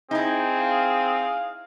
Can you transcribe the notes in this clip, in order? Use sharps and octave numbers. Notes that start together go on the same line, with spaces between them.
C4 D#4 E4 G#4
F5